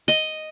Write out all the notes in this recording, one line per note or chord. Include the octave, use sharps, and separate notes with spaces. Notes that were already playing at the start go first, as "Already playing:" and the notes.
D#5